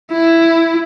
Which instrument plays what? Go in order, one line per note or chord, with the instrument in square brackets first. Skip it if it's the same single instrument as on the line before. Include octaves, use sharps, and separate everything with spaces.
[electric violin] E4